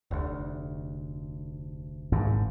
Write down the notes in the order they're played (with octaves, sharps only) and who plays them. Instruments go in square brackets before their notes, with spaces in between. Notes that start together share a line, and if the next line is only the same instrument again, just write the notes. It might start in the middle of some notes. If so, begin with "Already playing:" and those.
[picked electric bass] F1 D2
[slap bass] G#1 G#2